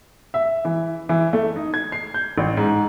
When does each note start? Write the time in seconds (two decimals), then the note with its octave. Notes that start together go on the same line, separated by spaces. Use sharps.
0.34 E5
0.65 E3
1.09 E3
1.33 A3
1.56 D#4
1.74 G#6
1.92 C7
2.14 G6
2.38 A1
2.57 G#2